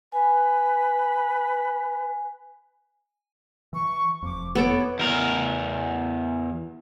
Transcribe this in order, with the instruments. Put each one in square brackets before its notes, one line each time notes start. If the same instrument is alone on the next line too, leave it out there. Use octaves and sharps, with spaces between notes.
[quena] B4 [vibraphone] G#5
[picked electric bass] E3 [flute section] C#6
[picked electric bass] F1 F2 [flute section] D6
[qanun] B3 A4 D6 [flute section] C#5
[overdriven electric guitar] E2 A#4